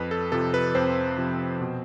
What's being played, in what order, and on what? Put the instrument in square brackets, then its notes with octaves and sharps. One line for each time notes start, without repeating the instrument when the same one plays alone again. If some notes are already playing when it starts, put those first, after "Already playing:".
Already playing: [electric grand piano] F2 B4
A4
C3 F3 A4
B4
F2 C4 C5
C3 F3
B2